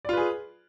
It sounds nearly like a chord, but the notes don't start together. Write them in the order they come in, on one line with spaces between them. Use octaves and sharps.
D5 F4 B4 G#4